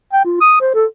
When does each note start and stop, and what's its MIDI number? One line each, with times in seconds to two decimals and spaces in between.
0.13 0.23 79
0.25 0.39 65
0.41 0.59 87
0.61 0.69 72
0.74 0.85 69